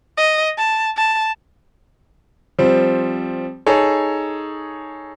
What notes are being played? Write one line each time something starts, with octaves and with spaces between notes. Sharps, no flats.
D#5
A5
A5
F3 G3 C4
D#4 G#4 A4 C#5